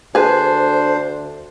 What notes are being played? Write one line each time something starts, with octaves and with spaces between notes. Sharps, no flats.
D2 D4 G#4 B4 C5